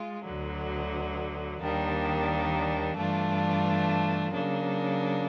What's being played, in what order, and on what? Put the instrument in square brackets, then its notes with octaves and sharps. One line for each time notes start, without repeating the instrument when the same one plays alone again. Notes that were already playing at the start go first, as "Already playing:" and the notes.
Already playing: [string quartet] G#3 F4
D2 D3 F#3
D#2 D#3 G3 A#3 D4
G2 E3 A3 D4 F4
C#3 F#3 A#3 D4